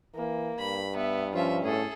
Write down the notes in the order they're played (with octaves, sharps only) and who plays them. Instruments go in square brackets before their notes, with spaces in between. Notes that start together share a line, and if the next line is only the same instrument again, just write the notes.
[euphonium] E3 [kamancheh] A#3
[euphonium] G2 [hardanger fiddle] B5
[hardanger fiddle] B3 [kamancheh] E5
[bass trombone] F3 [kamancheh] C#4 [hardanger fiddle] F4 E5
[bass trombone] A2 [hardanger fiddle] G#4 A4